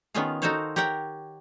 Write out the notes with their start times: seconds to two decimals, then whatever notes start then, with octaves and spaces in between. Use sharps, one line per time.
0.14 D#3 B3 C#4 F4 G#4 F5
0.42 D#4 F#4 A4 C5 C#5 F5
0.76 G4 A#4 C#5 F#5 G5